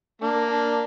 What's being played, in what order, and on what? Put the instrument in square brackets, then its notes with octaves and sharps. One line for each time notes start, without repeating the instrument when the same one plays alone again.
[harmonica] A#3 [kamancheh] D4
[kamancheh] D4